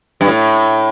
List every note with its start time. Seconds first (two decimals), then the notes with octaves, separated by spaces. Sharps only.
0.21 G2
0.28 A2